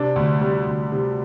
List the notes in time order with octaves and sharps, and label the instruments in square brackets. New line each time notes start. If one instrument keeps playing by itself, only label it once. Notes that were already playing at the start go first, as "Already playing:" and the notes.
Already playing: [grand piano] C3 D4
D2
G3
D2
C3